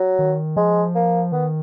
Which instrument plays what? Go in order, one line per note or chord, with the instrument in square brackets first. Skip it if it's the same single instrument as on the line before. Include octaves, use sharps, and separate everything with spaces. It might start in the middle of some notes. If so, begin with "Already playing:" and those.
Already playing: [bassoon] F#3
[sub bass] D#3
[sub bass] F3 [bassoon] G#3
[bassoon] A#3
[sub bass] D#3 [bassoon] B3